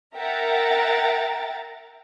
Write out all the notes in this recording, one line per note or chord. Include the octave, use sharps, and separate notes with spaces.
A#4 E5 F#5 G5 A#5 A6